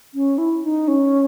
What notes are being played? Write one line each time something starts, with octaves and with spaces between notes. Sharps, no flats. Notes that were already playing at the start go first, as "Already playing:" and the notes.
C#4
E4
D#4
C#4